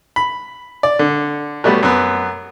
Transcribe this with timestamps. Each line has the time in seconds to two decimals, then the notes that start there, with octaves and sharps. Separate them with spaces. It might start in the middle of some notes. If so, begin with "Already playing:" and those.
0.16 B5
0.83 D5
0.99 D3
1.64 F#3 G3 A3 B3
1.83 F#2 B3